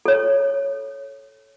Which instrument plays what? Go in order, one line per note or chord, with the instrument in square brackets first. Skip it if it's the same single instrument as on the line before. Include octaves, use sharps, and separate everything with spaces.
[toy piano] A4 C#5